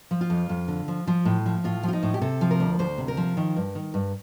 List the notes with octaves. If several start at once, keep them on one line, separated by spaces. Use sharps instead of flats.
F3
F4
F2
F2
D3
F3
F3
A2
F3
A2 F4
F3 F4
D#4
A2
G4
C3 A4
F3
A#4
D2
D2 C5
C3
A#4
F3
D#3
G2
D#3
G2